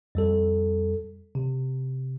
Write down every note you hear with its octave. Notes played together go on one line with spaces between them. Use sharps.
F2 G3 A4
C3